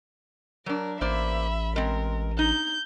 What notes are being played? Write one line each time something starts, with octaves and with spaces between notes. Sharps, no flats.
F#3 D4 A#4
A1 A#3 C5 D5 E5 B5
G#3 C4 A#4
D#4 G6